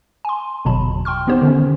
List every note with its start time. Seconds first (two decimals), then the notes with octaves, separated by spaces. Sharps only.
0.25 G#5 C6
0.65 G1 E2 B2 F#3 A5 B5
1.05 G5 C6 C#6 F6
1.27 E3 B3 D#4 G4 C5
1.42 D3 D#3 C#4